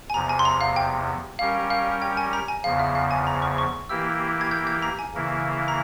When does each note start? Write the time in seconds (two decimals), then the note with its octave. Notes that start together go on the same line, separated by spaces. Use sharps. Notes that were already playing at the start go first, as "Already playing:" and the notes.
0.10 G#5
0.14 E2 C3 F3 A#5
0.29 G#5
0.39 C6
0.45 A#5
0.61 F5
0.76 G5
1.39 G3 C#4 G4 A#4 F5
1.70 F5
2.02 G5
2.17 G#5
2.33 A#5
2.48 G#5
2.64 E2 C#3 F3 F5
2.79 E5
2.95 F5
3.11 G#5
3.27 A#5
3.42 C#6
3.58 C#6
3.89 E3 A#3 E4 G4 E6
4.41 G#6
4.51 G6
4.67 G6
4.82 A#5
4.99 G#5
5.14 C#3 E3 A#3 E4
5.68 A#5